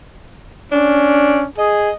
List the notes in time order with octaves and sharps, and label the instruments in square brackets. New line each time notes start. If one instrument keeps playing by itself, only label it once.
[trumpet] C#4 [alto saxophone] D4
[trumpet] G#4 [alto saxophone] D#5